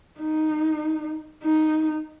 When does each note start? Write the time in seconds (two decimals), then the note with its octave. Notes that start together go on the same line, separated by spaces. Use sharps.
0.20 D#4
1.43 D#4